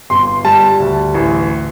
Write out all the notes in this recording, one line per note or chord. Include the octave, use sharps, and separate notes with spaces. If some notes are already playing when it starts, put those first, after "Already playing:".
G1 C6
G3 A5
D2
A1